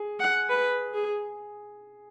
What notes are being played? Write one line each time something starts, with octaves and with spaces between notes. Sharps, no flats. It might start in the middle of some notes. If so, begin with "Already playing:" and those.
Already playing: G#4
F#5
B4
G#4